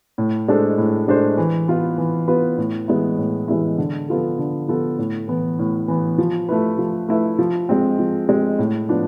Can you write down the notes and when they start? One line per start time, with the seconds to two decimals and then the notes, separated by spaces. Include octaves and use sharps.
0.18 A2
0.48 G#3 D4 A4 C5
0.78 A2
1.08 G#3 D4 A4 C5
1.38 E3
1.68 B3 F4 B4
1.98 E3
2.28 B3 F4 B4
2.58 A2
2.88 E3 G#3 B3 E4
3.18 A2
3.48 E3 G#3 B3 E4
3.78 D3
4.08 F3 B3 F4 A4
4.39 D3
4.68 F3 B3 F4 A4
4.98 A2
5.28 E3 B3
5.59 A2
5.88 E3 B3
6.18 F3
6.49 A3 E4 B4
6.79 F3
7.08 A3 E4 B4
7.39 F3
7.69 G#3 C4
7.99 F3
8.29 G#3 C4
8.59 A2
8.89 F3 B3 D4